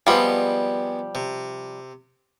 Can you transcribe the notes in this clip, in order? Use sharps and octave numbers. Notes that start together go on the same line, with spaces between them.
F3 G3 G#3 B3 C4
C3